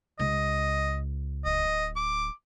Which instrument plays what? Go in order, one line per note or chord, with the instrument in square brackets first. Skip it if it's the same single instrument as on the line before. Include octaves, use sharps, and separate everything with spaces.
[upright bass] C#2 [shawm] D#5
[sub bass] D1 [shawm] D#5
[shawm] D6